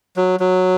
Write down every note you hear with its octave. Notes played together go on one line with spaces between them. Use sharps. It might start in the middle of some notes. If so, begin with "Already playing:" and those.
F#3
F#3